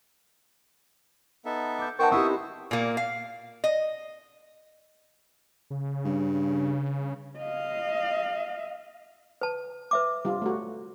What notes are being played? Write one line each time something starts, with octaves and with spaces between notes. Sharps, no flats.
B3 D#4 A4 E5
D6 G6
B3 D#4 A#4 C5 F#5 G5 A5 C#6
C4 E4 G4 E5 C#6 D#6
A#2 A#3
F5
D#5
C#3
G2
D#5 F5
B4 A5
B4 E5 D6
G3 F4
A3 F#4